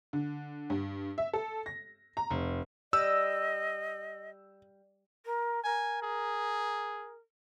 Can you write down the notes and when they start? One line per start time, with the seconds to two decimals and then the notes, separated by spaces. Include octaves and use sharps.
0.13 D3
0.70 G2
1.18 E5
1.33 A4
1.66 A#6
2.17 A#5
2.30 F1
2.93 G3 D#5 E6
5.25 A#4
5.64 A#4 G#5
6.02 G#4